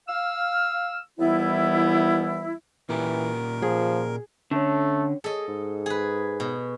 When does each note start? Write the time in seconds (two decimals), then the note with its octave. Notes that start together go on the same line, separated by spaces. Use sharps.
0.08 F5 E6 F6
1.19 D#2 E3 G3 B3 E4
2.89 A#2 E3 A#3 G4 A#4
3.62 F3 G#4
4.51 D3 A3 C#4 C#5
5.24 G#4 A4 D#5
5.48 G#2
5.86 G#4 B4
6.40 B2